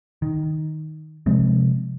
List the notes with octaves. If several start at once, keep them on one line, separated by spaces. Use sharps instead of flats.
D#3
C3 F3 G#3 C4